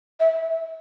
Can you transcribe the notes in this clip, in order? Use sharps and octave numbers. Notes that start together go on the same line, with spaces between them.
E5